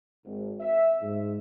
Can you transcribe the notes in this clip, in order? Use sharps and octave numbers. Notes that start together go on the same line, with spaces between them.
G#1
E5
G#2